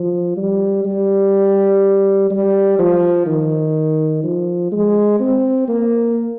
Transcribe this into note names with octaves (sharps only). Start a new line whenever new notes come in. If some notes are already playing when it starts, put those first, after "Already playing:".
Already playing: F3
G3
G3
G3
F3
D#3
F3
G#3
C4
A#3